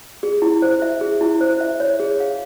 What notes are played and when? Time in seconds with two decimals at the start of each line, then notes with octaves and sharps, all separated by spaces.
0.23 G#4
0.42 E4
0.62 C5
0.82 E5
1.01 G#4
1.21 E4
1.41 C5
1.61 E5
1.80 C#5
2.00 G#4
2.20 F5